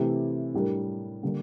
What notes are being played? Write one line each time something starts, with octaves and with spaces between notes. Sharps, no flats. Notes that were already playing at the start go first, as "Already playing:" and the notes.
Already playing: C3 E3 A3 E4 G4
A2 G3 D4 G4 A#4
D3 G3 A#3 D4